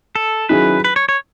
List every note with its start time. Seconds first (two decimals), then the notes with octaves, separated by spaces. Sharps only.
0.15 A4
0.49 D#3 F#3 C#4 E4 G#4 B4
0.84 B4
0.96 C#5
1.09 C#5